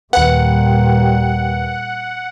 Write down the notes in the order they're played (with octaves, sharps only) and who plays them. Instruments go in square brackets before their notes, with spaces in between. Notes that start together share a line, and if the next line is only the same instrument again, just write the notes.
[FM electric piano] D#2 B4 [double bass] A#2 G3 [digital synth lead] F#5